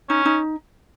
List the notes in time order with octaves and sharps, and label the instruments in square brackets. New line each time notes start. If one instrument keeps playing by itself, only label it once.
[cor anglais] C#4 [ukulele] D#4
[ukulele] D#4